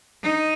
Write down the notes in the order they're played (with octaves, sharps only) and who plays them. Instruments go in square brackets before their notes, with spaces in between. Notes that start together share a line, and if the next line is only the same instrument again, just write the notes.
[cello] D#4